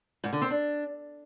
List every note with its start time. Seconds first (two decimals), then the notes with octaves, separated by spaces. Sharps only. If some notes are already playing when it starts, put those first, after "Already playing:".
0.24 G#2
0.33 D3
0.42 C4
0.50 D4